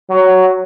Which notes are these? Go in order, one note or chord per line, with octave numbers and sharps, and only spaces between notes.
F#3